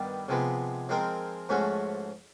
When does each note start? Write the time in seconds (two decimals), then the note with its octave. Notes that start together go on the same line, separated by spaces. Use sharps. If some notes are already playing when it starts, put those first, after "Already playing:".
Already playing: G2 D#3 G3 B3
0.28 C3 F3 G#3 B3
0.89 F3 G#3 C4 F4 A#4
1.49 G#2 F3 A3 C#4 F#4